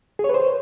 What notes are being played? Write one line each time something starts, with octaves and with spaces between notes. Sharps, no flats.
G#4
C#5
B4
C5